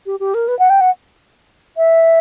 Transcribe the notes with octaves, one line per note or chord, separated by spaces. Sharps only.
G4
G4
A#4
B4
F#5
G5
F#5
E5